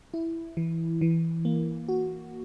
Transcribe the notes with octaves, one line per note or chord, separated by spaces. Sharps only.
E4
E3
E3
A#3
F#4